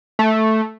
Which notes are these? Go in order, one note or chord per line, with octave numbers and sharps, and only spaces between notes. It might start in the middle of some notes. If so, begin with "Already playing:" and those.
A3